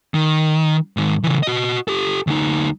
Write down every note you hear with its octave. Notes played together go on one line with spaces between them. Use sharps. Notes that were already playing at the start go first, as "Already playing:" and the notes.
D#3
G#2 D#3
C#3 E3
F#4 D#5
G4 A4
D2 D#4